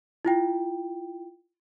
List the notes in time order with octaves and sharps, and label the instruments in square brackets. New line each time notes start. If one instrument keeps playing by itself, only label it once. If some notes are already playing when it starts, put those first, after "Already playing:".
[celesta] E4 F4 G5